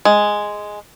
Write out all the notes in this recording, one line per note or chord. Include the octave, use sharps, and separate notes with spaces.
G#3